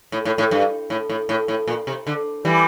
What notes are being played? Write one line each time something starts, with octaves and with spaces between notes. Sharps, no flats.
A2
A2
A2
G2
A2
A2
A2
A2
A#2
C3
D3
E3 G3